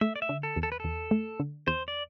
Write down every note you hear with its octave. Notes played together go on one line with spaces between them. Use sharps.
A3 E5
D5
E5
D3
A4
E2
A4
B4
E2 A4
A3
D3
E2 C5
D5